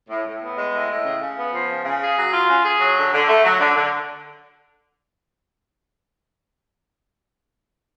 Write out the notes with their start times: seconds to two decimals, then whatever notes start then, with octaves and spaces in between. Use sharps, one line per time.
0.10 A2
0.26 A2
0.42 B3
0.57 G#3
0.73 A2
0.90 A2
1.06 C#3
1.21 C#3
1.38 B3
1.54 F3
1.69 C#3
1.85 C#3
2.01 G#4
2.17 F#3
2.33 F4
2.49 C#4
2.65 G#4
2.81 F#3
2.97 D3
3.13 D3
3.28 A3
3.44 F#3
3.60 D3
3.76 D3